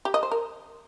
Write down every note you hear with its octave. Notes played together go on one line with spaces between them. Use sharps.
G4
D#5
C5
A#4